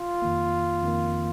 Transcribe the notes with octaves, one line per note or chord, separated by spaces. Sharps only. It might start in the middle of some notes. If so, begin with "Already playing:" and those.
Already playing: F4
F2 D#3 A#3
F2 D#3 A#3